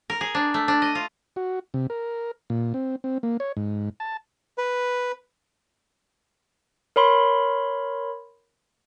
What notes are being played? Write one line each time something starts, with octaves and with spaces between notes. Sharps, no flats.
A#4
G#4
D4
A3
D4
D#5
F4
F#4
C3
A#4
A#2
C4
C4
A#3
C#5
G#2
A5
B4
A#4 C#5 B5 C6